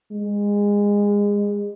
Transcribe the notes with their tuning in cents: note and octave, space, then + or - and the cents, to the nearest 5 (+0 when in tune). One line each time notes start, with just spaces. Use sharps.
G#3 -25